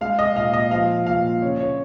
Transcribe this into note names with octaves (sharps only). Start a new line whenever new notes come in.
G#3 F5
D#5
A#2 F5
D#5
F3 F5
A#2 F5
C#3 C#5
C#5